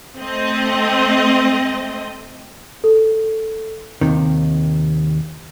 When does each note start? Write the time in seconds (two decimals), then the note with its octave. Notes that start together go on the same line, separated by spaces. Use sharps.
0.17 A3 C4 D#5
2.84 A4
4.01 D#2 G#2 C3 D#3